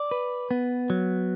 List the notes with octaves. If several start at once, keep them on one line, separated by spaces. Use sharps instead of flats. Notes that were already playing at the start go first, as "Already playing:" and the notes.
Already playing: D5
B4
B3
F#3